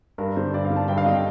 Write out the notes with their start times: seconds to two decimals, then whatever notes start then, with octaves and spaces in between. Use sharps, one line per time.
0.18 G2 A#4
0.36 D3 C5
0.54 G2 D5
0.65 F5
0.71 D3
0.76 A5
0.88 G2 G5
0.98 F5
1.06 D3 D#5
1.14 G5